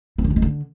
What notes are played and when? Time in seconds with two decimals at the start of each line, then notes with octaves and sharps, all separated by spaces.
0.18 C4
0.24 D3
0.30 G3
0.36 G#3
0.42 D3